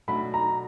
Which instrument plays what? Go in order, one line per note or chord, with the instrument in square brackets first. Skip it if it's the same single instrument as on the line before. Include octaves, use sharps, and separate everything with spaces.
[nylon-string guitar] B2 F#3 A3 D4 [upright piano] B5
[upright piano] A#5